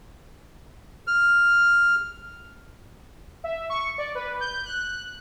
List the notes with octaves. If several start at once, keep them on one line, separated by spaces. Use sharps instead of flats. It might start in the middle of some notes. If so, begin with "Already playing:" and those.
F6
E5
C#6
D5
B4
G6
F#6